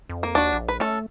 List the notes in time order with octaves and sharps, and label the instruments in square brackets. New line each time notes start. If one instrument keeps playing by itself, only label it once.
[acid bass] F2
[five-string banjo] A#3
[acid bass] D#2 [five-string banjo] D4 F#4
[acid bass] A#1
[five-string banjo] B4
[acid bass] A3 [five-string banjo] C#4 A4